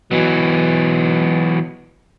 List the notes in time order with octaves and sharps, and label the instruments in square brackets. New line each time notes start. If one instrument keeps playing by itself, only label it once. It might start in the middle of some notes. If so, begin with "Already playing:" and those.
[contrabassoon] B2 [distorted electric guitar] E3 F#3